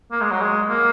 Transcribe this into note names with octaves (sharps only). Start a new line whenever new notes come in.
A#3
G#3
F#3
G#3
A#3